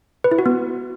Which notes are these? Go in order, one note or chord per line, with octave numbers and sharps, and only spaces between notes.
B4
E4
F#4
B3